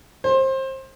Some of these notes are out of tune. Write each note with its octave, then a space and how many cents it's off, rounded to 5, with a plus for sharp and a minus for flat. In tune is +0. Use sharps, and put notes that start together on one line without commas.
C5 +25